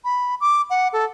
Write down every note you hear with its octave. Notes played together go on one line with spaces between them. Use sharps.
B5
D6
F#5
A4